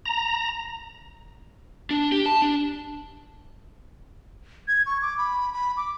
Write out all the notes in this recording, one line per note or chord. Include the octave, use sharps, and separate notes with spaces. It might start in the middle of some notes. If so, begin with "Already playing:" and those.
A#5
D4
G4
A5
D4
G#6
C#6
D6
B5
B5
D6